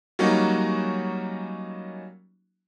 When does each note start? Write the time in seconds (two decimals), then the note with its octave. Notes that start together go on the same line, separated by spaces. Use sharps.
0.19 F#3 G3 A#3 C#4 D#4 F#4